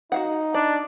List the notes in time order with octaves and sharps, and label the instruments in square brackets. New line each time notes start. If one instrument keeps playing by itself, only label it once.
[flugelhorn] D#4 [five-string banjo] F#4 F5 F#5
[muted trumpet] D4 [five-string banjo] D5